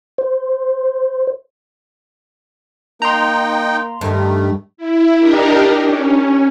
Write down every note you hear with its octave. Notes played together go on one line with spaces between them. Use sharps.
C5
A#3 D#4 G5 A#5 C6
G2 D#3 A3
E4
D4 D#4 G4 A#4
C#4